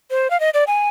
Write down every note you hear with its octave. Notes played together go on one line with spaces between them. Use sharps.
C5
F5
D#5
D5
G#5